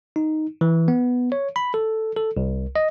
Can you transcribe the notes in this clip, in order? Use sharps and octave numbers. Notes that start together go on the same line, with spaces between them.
D#4
E3
B3
C#5
B5
A4
A4
C2
D#5